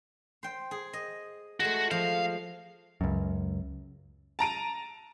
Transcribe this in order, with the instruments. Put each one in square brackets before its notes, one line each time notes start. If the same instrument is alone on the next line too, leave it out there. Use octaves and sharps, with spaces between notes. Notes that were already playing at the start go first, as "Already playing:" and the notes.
[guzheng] C5 G5
G#4
D#5
[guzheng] G#3 A3 [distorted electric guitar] F#4
[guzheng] F3 [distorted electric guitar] F5
[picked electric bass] C#2 F#2
[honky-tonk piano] A5 A#5 D7 D#7